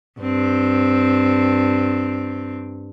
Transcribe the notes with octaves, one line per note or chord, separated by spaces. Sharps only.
G2 C4